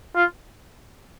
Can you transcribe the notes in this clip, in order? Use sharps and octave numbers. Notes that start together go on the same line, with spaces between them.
F4